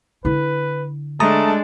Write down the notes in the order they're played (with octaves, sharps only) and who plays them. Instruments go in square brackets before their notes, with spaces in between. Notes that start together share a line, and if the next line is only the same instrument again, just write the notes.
[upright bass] D3 E4 [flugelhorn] B4
[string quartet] G#3 D4 [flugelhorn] A3 [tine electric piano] A5 A#5 D#6